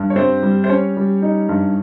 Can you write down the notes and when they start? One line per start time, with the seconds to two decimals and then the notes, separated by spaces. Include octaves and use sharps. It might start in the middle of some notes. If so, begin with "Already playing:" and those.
Already playing: G2
0.10 C#5
0.16 G3 C4 C5
0.43 G3
0.64 C5
0.69 C#4 C#5
0.97 G3
1.22 D#4
1.49 G2